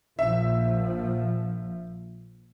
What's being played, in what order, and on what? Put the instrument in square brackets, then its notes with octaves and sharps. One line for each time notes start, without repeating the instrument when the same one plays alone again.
[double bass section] A#1 F3 [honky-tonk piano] E5